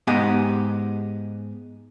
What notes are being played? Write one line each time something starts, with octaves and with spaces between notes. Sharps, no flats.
G#2 B3 G4 D#5 G#5